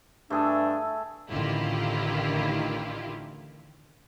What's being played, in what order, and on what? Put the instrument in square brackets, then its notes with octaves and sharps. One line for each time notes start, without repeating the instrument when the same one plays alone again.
[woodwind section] G2 D4 [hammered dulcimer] A3 G#4 E5
[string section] A1 D3 D#3 E4 F4 G4